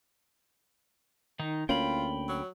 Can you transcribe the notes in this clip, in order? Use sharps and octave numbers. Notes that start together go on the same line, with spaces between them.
D#3 D#4
D2 A#3 C#4 F4 G5 B5
F#3